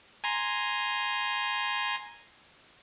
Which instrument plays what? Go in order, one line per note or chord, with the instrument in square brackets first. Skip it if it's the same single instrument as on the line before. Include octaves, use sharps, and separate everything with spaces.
[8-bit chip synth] G#5 A#5 C6